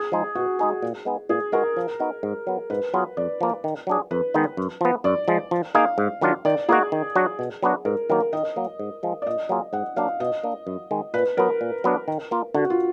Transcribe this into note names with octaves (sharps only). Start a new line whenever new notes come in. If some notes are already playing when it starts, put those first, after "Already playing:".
Already playing: G#4
F3 G#3 D#4
B2 F#4
G#3 D#4 G#4
A#2
G#3 B3 D#4 G#4
A#2 G#4
G#3 D#4 F#4 A#4
F3
B3 D#4 F#4
G#2
F#3 B3
G#2 B4
F#3 B3 F4 G#4
F2 D5
F3 A#3
D#3
F#3 D4 G#4
F2 B4
D#3 G#3 B3 D#4
F#2
F3 B3
F#2 D5
F3 G#3
F3
A#3 D#4 G#4 F5
G#2
D#3 F#3 D4 F4
D#3 D5
A#3 D#4 F#4 G#4
D#3
F#3 D4 F#4
B2
F#3 B3 D4 F#4
G#2 A#4
D#3 F#3 A#3 A#4
D#3 D#5
F#3 A#3
G#2
F3 G#3
D5
A#2 D#5
F#3 A#3 F4 G#4
G#2 F#5
F#3 A#3 D4 F5
B2 D#5
A#3 D4
F#2
D#3 G#3
A#2 B4
F#3 B3 A#4
A#2
F#3 B3 D4
D#3
A#3 F4
D3 F#4
F4